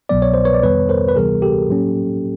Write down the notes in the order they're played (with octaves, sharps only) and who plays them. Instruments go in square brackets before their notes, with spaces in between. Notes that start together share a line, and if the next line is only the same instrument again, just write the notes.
[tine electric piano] C2 B2 F#3 B3 D5
C#5
C5
B4 C#5
D5
F2 C3 D#3 G3 B3 B4 C#5
A#4 C5
B4
D2 C3 E3 G3 B3 G#4 A#4
G4 A4
A2 F#3 A#3 C#4